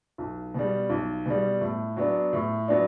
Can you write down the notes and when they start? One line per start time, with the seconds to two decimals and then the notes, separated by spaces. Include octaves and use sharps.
0.18 B1
0.54 B2 G3
0.90 B1
1.26 B2 G3
1.61 A2
1.97 F#3 B3 D4
2.33 A2
2.68 F#3 B3 D4